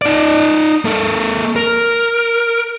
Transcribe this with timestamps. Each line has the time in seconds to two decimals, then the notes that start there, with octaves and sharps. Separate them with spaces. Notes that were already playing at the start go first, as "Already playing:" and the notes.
0.02 D#4 D5
0.85 A#3 A4
1.56 A#4